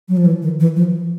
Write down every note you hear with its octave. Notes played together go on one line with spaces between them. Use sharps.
F#3
F3
E3
D#3
E3
F3